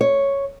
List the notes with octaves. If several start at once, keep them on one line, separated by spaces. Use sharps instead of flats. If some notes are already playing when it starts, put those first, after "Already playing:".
C#5